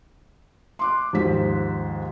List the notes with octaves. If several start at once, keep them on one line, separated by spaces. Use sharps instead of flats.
C6 D6 F#6
D#2 G#2 F3 C5 B6